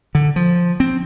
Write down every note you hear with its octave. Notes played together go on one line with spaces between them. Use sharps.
D3
F3
C4